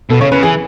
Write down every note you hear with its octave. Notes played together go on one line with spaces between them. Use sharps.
B2 A4
C#3 C#5
C#3 B4
E3 G#4